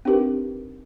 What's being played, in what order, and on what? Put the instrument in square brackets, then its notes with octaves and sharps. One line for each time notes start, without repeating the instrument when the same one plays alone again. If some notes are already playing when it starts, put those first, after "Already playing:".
[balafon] C4 D4 D#4 G4 A#4 B4